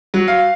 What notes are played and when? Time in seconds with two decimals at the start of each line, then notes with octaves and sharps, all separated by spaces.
0.14 F#3
0.28 F5